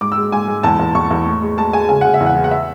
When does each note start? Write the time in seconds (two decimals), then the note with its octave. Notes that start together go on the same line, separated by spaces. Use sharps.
0.01 G#2 D6
0.12 E6
0.17 G#3
0.32 G#2 G#5
0.48 G#2
0.63 E2 A5
0.79 E2
0.95 E2 C#6
1.11 E2
1.26 A2
1.42 G#3
1.57 G#3 A5
1.73 G#3 G#5
1.88 C#3 G#5
2.01 C#3 F#5
2.14 E5
2.20 E2
2.26 F#5
2.36 E3
2.44 F#5
2.51 E5